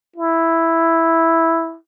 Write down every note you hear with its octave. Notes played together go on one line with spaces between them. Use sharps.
E4